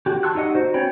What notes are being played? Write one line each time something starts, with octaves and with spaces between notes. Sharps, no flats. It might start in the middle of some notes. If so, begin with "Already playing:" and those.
F#4 G4
A5 C6 C#6 E6 F#6
D#4 G4 D#5 F#5
F#4 C5
B3 C#4 C#5 G5 B5